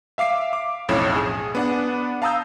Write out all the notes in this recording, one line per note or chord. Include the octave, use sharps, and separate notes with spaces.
E5 F5 D6 C7
D6
B1 F2 A2 C#4 E7
G#4
B3 D4 F#5
F5 A5 A#5 D#6 E6 G6